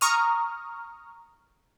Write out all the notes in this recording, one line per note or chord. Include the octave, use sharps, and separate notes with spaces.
A#5 C#6 D#6 F6